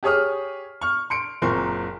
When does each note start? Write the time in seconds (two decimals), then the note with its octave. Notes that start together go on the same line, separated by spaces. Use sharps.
0.03 G4 G#4 C#5 D#6 F6
0.81 C#6 F6
1.10 C6 C#7 D7
1.42 F#1 A#2 C4 A#4 C6 C#6